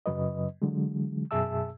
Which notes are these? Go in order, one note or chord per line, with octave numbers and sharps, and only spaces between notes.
F#2 C#3 F#3 B4 D#5
D3 E3 F#3 G#3
F#2 B2 G#4 E5 A5 E6